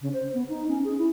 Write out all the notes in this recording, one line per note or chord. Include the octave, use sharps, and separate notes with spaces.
C#3
C5
B3
D#4
C#4
G#4
E4